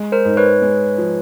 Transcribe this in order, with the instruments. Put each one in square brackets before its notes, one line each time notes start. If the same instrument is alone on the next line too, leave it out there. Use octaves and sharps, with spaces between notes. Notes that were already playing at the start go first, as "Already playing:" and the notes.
Already playing: [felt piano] G#3
[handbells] A#4 C5
[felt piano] G#2
[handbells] B4 C#5
[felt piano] G#3
F3